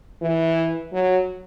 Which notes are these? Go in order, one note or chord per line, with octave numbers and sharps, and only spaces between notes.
E3
F#3